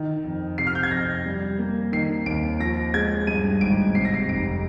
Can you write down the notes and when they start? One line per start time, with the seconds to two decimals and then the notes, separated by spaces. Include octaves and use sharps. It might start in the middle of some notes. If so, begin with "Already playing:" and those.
Already playing: D#3
0.24 F2
0.58 C3 C7
0.67 F6
0.75 G6
0.83 G#6
0.91 F2 A#6
1.26 G3
1.59 A#3
1.92 D#3 C7
2.26 D#2 D7
2.60 F3 A#6
2.94 G#3 G#6
3.27 G2 D#7
3.61 G#1 D7
3.95 C3 C7
4.05 A#6
4.14 C7
4.28 F1 D7